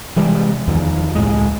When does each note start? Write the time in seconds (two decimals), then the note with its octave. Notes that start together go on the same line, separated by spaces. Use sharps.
0.16 C3 E3 G3 G#3
0.68 E2 D#3 F3
1.15 C#2 A2 G#3